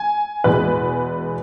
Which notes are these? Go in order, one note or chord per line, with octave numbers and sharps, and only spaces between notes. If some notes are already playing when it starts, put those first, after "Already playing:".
Already playing: G#5
E2 B2 G#3 B4